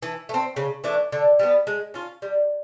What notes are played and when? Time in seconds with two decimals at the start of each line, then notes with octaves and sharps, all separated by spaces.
0.03 E3
0.29 A3
0.34 C4
0.56 C#3
0.84 E3 A3 D4
1.12 D3
1.39 G3 B3
1.67 G#3
1.94 C#4 F4
2.22 G3